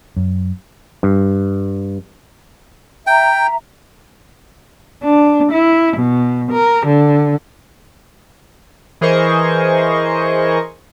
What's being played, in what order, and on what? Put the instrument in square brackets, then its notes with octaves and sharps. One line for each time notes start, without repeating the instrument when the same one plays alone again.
[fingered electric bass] F#2
[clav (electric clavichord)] G2
[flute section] E5 A#5 [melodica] G5
[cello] D4
E4
B2
A#4
D3
[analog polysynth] E3 G#4 A#4 C5 D#5 C#6